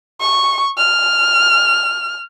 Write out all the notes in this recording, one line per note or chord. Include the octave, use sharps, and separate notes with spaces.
C#6
F6